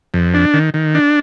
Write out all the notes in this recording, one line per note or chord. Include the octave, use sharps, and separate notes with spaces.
F2
D4
D#3
D#3
D4